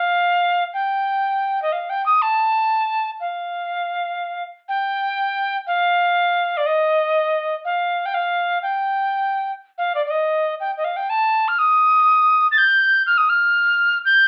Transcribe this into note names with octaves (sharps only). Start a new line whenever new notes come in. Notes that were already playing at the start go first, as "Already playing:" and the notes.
Already playing: F5
G5
D#5
F5
G5
D#6
A5
F5
G5
F5
D5
D#5
F5
G5
F5
G5
F5
D5
D5
D#5
G5
D#5
F5
G5
A5
F6
D#6
A6
G6
F6
D#6
F6
G6